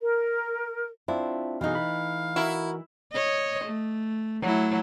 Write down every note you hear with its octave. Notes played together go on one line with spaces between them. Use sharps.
A#4
C4 D4 E4 F4
B2 E3 A3 D#4 G#4 F5
B5
E4 F#4 A#4
C#5 D#5
A3
F#3 A3 E4